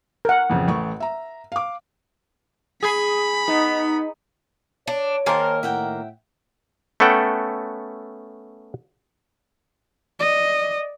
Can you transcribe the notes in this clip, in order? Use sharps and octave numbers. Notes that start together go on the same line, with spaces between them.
A#4 F#5
A1 F2 C#3
A1 A3 C#6
E5 A#5
F5 D6
G#4 B5
B3 D#4
D4 C#5
D#3 A#3 G#4 A#4 C5 A5
A2 E5 F#5 G5
A3 B3 C#4 A4 F#5 G5
D5 D#5